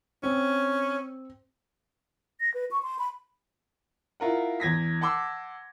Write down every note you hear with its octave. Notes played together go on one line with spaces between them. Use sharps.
C4 C#4
A#6
B4
C#6
C6
B5
E4 F4 A#4 F#5
E2 G#6 A#6 B6
F#5 A5 C6 D6 E6